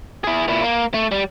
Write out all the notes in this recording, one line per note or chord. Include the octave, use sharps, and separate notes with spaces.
E4 G#4
A#2 E4
A#3
A3
G3